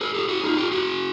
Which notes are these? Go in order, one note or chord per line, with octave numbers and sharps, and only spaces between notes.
G#4 A#4
G4 A4
F#4 G#4
D#4 F4
F4 G4
F#4 G#4